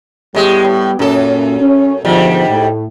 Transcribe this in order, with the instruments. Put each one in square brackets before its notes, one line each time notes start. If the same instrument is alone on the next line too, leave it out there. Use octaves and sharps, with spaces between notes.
[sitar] A2 G#3 [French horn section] G3 B3 G4
[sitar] A2
[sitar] F#2 A4 [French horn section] A#2 C#4
[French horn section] C#4
[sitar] G#2 G3 [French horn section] B2 D3 F3
[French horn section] A2